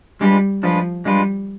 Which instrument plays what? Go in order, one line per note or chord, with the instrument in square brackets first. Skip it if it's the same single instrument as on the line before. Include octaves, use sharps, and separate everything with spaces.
[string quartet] G3 [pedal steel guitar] G#3 D4 F4 B4
[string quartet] F3 [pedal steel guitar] G#3 D4 F4 B4
[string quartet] G3 [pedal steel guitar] G#3 D4 F4 B4